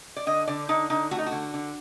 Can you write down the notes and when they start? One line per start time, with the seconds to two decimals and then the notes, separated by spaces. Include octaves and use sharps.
0.17 D5
0.27 D3 D#5
0.47 D3 D5
0.69 D3 D#4
0.90 D3 D#4
1.11 A3 F#4
1.18 D#4
1.26 F#4
1.32 D3
1.54 D3